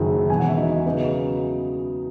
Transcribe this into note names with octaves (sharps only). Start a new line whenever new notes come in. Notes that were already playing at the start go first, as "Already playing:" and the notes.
Already playing: F#1 F#2 D#3 F#3 G#4
E1 E2 B2 G#5
F#5
E5
D#4 D#5
C#3 F#3 B3 D#4 D#5